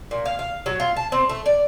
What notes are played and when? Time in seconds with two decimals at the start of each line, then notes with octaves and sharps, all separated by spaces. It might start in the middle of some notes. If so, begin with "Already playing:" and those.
0.11 A#2
0.25 F5
0.39 F5
0.66 F#3
0.80 F4
0.97 A5
1.12 C4
1.29 A3
1.46 D5